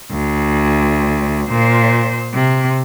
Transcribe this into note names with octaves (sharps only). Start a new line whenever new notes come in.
D2
A#2 C5
C3